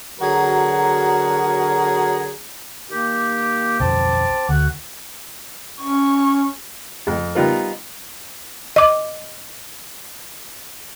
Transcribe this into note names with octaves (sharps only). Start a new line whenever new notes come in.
D3 F#3 F#4 G#4 A#4
D#3 A#3 G4
B1 F2 C4 A5 D6
D2 F#4
C#4 C#6
F2
G3 B3 D#4 F4 A#4
D#5 D6